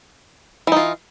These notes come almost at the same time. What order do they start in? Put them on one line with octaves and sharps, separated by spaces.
E3 D#4 F4